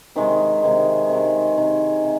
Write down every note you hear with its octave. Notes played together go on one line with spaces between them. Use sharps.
C3 D#3 G#3
C3 D#3 G#3
C3 D#3 G#3
C3 D#3 G#3
C3